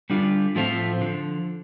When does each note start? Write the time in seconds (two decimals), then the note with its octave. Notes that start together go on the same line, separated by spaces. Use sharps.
0.10 D3 G3 D4 F4
0.55 A2 F3 A3 C4 F4
1.01 D3 F3